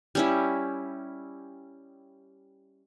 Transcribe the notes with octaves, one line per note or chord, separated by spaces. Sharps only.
G3 C#4 E4